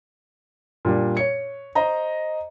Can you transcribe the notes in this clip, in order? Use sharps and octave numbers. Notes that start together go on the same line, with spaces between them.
A#2 G3 D4
C#5 C#7
C5 D#5 A#5